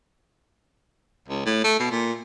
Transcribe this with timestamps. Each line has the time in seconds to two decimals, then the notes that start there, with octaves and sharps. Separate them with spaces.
1.28 C#2
1.45 A2
1.64 A3
1.80 B2
1.91 A#2